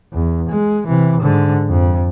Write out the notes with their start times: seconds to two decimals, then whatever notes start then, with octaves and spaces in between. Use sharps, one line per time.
0.14 E2
0.50 G#3
0.88 C3 E3
1.21 G#2 D3
1.69 F2